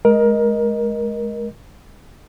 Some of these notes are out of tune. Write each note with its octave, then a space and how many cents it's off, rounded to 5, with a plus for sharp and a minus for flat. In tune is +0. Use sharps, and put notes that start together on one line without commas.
G#3 +25 A#4 +20 D#5 +0